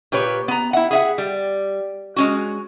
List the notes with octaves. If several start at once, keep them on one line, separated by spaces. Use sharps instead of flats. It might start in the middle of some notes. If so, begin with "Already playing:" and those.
A#2 G4 B4 C#5
B3 A#5
E4 F#5
G#4 E5 F#5
G3
G#3 C#4 F#4